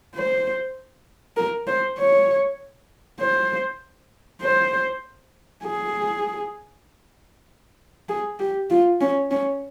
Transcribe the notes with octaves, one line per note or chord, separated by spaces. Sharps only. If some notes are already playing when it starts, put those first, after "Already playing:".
C5
A#4
C5
C#5
C5
C5
G#4
G#4
G4
F4
C#4
C#4